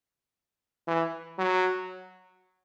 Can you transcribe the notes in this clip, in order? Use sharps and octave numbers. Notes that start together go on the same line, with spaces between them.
E3
F#3